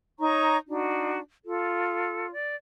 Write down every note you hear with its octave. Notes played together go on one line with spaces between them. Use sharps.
D#4 C#5 A#5 C#6
D4 D#4 F#4
F4 A4
D5